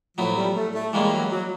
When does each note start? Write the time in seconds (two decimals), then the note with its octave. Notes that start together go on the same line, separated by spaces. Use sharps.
0.18 A2 F3 F#3 B3
0.37 G3
0.56 A3
0.74 A3
0.93 E3 G3 G#3 A#3 C#4
1.12 F#3
1.31 F#3